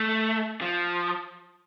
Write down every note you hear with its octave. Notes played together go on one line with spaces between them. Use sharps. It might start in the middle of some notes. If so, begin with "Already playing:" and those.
Already playing: A3
F3